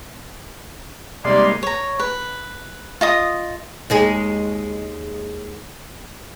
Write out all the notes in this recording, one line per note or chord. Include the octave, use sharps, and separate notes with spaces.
C3 G3 G#3 A#3 D#4 G4 D5 C6
C#5 A#5
B4
F4 D#5 D#6
D#2 G#3 G#4